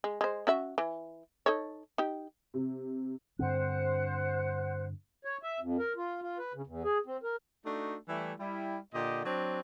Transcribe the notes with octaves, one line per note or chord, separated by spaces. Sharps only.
G#3
G#3 C5
C#4 F#4 E5
E3
D#4 A4 C#5
D#4 G4
C3
G2 D3 C4 C5 F#5 F#6
C#5
E5
F2
A#4
F4
F4
B4
C#3
E2
G#4
C4
A#4
A3 D4 D#4 F#4
E3 G3 A3 E4
G3 E4
A#2 D3 G4 D#5
F#3 C4 D4